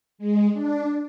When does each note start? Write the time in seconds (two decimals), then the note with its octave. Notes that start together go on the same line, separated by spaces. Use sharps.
0.18 G#3
0.53 D4